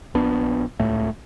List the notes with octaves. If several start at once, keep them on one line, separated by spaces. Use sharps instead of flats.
A#1 B3 D4
D#1 C#2 A2 A3